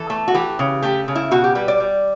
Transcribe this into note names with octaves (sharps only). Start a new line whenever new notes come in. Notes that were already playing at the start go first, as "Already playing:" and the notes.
Already playing: E3 A4
A3
F#4
E3 G4
C#3
A3 G4
C#3
E4
B2 F#4
G4
G3 B4
D5
G3